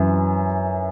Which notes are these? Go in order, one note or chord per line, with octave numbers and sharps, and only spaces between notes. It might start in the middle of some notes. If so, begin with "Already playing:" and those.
Already playing: F#2 E3